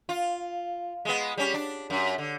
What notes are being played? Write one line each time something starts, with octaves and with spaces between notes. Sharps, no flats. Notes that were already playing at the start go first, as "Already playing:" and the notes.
F4
G#3 B3
G3 C#4
D4
F#2
D3